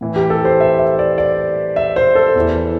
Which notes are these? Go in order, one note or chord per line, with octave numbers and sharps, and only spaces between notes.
A2 E3
G4
A4
C5
E5
E5
D5
D5
E5
C5
A4
E2 E3